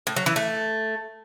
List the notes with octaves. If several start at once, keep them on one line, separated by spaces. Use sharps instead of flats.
A2
F#3
E3
A3